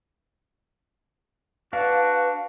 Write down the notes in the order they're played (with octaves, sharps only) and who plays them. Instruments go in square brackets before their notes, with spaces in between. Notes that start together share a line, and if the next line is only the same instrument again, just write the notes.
[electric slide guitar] D4 [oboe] F#4 [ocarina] B4 [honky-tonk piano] F5